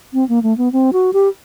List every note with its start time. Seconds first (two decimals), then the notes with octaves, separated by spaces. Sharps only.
0.14 C4
0.29 A#3
0.43 A3
0.58 B3
0.73 C4
0.93 F#4
1.13 G4